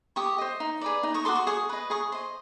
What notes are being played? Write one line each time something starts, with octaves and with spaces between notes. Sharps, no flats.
G4 C#6 D#6
C5 D#5
D#4
G#4 B4 D5
D#4
C#6 D#6
F#4 A4 C6 D6
C#6 D#6
G#4 C#6 D#6
B4 D#5
G#4 C#6 D#6
C5 D#5